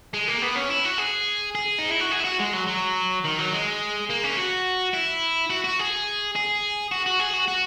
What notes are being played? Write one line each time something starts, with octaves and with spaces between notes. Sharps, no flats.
G#3
A#3
B3
C#4
E4
F#4
G#4
G#4
D#4
E4
F#4
G#4
E4
F#4
G#3
F#3
F#3
D#3
F#3
G#3
A#3
C#4
G#4
F#4
E4
F#4
F#4
G#4
G#4
F#4
F#4
G#4
F#4
F#4